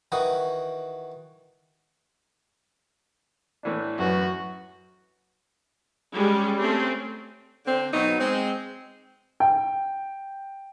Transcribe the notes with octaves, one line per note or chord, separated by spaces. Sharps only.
D#3 E3 F#4 D#6
A2 E3 D4
F#2 F#4 B4
G3 G#3 C#4
A3 C4 C#4
D3 C4
B2 F#3 B3 D#4
G#3 C4
G5